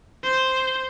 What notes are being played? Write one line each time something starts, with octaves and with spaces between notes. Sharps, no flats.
C5